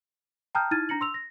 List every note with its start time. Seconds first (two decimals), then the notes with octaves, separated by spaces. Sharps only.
0.55 G5 A5 A#5 D#6 F6 G6
0.71 D#4 E4 F6 G#6 A6 D#7
0.89 D4 A#5 A#6 C#7 F#7
1.01 C6 E6 F7
1.14 A#6